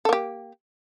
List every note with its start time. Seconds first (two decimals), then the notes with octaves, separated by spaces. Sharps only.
0.05 A4
0.09 A#3
0.13 G4